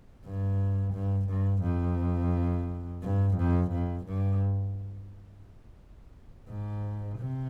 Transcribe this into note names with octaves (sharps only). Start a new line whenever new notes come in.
G2
G2
G2
F2
G2
F2
F2
G2
G#2
C3